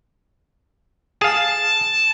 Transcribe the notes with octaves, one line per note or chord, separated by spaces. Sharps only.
G#4 F5 A5